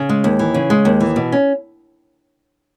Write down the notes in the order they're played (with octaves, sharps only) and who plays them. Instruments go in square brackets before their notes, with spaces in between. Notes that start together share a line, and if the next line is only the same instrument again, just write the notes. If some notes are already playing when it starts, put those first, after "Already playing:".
Already playing: [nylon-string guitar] C#3
G#3
D#2
E3
C#3
G#3
D#2
E3
B2
C#4